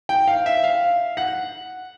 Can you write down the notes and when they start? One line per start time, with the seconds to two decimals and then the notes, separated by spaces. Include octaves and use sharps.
0.09 G5
0.28 F5
0.46 E5
0.64 F5
1.17 F#5